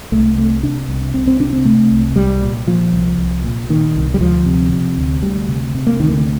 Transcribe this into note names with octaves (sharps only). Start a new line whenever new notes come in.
C2 A3
C3 A3
C3 D4
C2
C2 C4
C4
C3 D4
C4
C3 A3
C2
C2 G3
A#2
A#2 F3
C2
C2
A#2
A#2 D#3
C2
G3
D2 F3
C3
C3
D2
D2 G3
C3
C3
A#3
D2 D#3
D3